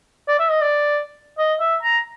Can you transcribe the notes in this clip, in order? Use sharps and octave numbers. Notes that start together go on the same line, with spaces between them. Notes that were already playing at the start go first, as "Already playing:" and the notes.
D5
E5
D#5
D5
D#5
E5
A#5